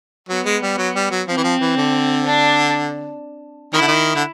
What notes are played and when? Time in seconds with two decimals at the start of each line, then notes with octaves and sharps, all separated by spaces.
0.29 F#3 B3
0.46 G#3
0.62 G3
0.78 F#3
0.95 G3
1.11 F#3
1.28 F3 C4
1.37 E3
1.44 F3
1.60 E3
1.77 D3
2.26 D4
3.73 D#3 E4
3.81 D3
3.88 D#3
4.15 D3